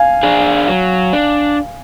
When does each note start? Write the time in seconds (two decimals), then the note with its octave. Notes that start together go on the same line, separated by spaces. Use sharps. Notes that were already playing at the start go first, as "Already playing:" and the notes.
Already playing: F5 G#5
0.23 D4 G#4
0.68 F#3
1.13 D4